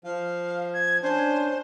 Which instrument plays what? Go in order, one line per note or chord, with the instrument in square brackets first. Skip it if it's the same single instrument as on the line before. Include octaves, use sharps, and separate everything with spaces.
[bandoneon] F3 [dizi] F5
[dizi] G#6
[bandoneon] C#4 D4 [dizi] C5